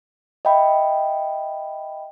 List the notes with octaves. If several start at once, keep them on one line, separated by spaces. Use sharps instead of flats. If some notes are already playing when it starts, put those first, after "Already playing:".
D#5 E5 G5 B5